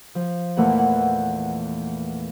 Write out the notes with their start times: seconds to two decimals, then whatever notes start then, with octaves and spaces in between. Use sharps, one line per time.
0.15 F3
0.57 E2 A#2 E3 A3 A#3 F#5
0.78 F#5